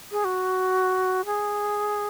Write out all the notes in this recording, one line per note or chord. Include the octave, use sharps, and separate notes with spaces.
G#4
F#4
G#4